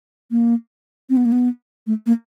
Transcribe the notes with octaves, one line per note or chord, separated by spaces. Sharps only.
A#3
C4
B3
A#3
B3
A3
A#3